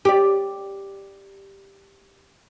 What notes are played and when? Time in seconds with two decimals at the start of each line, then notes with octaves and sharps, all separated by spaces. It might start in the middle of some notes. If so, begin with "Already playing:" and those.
0.05 G4 D5